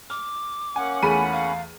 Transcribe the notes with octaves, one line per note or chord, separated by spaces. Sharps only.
D6 F6
A#3 C#4 F#5 G#5
E2 A3 G#4 G#5 B5 D#7
F5